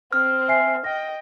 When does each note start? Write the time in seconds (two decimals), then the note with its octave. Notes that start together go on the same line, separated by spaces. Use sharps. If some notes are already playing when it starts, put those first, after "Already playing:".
0.12 C4 C5 F6
0.48 E5 G#5 C7
0.84 D#5 G5 A#6